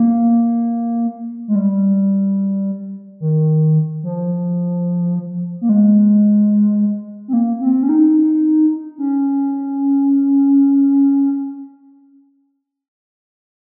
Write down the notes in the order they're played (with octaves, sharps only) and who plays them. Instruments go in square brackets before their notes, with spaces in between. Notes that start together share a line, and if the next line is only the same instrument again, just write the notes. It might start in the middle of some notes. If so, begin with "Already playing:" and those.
Already playing: [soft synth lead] A#3
G#3
G3
D#3
F3
A#3
G#3
C4
A#3
C4
C#4
D#4
C#4